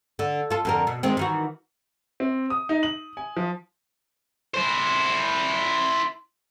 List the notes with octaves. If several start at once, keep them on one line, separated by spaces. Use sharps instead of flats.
D3
F4 A4
F2 D3 A#4
B2
D#3 G#3 C4
D#3 E3 F#4
C4
D#6
D#4
F#7
G#5
F3
E4 C5